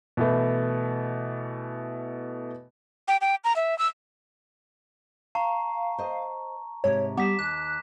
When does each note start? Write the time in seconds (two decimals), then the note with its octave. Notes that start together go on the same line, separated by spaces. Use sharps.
0.17 B2 E3 A3
3.08 G5
3.21 G5
3.44 A#5
3.56 E5
3.79 E6
5.35 F5 A5 A#5 C#6
5.98 C5 D#5
6.84 G#2 C3 C#5
7.17 G3 B3 D6 B6 E7
7.39 D#2 F#6